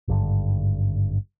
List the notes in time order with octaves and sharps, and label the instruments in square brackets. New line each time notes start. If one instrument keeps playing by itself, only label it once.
[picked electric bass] G#1 G2 D3